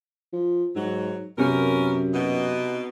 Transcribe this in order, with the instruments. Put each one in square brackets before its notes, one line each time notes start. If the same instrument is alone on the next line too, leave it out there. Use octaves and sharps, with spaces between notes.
[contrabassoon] F3
[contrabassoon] G#2 [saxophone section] F#3
[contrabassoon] F#2 [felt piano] C3 [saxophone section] B3 C#4 A#4
[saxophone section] B2 D#4